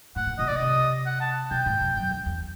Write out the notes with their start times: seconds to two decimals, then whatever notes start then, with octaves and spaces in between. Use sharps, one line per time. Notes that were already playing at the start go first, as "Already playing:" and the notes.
0.16 A2 F#5
0.27 A#2
0.39 A#2 D#5
0.47 B2 D5
0.56 C3 D#5
1.06 F#5
1.21 A5
1.51 B2 G5
1.66 G#2
1.81 F2
1.96 F#2
2.11 F2
2.26 E2